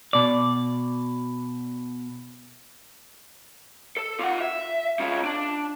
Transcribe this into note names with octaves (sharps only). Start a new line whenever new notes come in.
B2 D5
A4
F4 F#5
E5
C#4 F4
D4